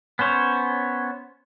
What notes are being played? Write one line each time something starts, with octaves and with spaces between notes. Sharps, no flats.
B3 C#4 C5 C#5